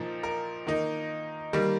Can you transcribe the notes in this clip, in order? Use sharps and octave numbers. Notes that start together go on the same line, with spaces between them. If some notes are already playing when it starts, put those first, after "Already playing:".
Already playing: A#2 F3 D#4 A#4
A#4
D#3 A#3 D#4
D#3 G3 A#3